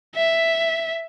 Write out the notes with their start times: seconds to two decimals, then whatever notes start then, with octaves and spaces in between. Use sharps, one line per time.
0.15 E5